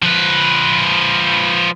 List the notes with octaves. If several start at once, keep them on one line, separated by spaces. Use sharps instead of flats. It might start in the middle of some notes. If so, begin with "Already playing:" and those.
F3 B4